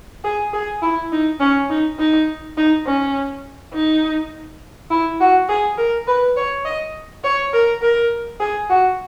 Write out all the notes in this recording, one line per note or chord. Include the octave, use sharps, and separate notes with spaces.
G#4
G#4
E4
D#4
C#4
D#4
D#4
D#4
C#4
D#4
E4
F#4
G#4
A#4
B4
C#5
D#5
C#5
A#4
A#4
G#4
F#4